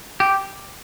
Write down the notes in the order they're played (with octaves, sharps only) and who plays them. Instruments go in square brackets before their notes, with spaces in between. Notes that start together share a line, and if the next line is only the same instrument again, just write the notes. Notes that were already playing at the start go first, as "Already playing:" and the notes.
[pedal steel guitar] G4